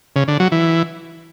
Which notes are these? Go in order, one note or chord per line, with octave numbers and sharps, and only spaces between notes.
C#3
D3
F#3
E3